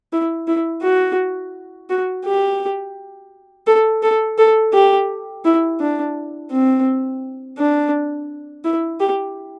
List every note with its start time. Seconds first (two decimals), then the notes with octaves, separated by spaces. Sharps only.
0.13 E4
0.48 E4
0.83 F#4
1.90 F#4
2.25 G4
3.67 A4
4.03 A4
4.38 A4
4.73 G4
5.45 E4
5.80 D4
6.51 C4
7.58 D4
8.65 E4
9.00 G4